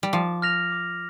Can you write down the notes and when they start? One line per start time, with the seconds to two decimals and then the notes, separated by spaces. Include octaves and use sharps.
0.03 G3
0.13 F3 D6
0.42 F6 A#6 F7
0.72 D6